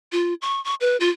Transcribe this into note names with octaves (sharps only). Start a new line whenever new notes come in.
F4
C#6
C#6
B4
F4